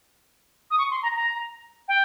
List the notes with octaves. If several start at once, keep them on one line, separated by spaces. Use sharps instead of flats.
D#6
C#6
C6
A#5
A#5
G5